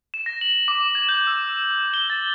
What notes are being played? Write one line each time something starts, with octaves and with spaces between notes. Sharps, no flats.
E7
A#6
F#7
D6
G#6
G6
E6
G7
A6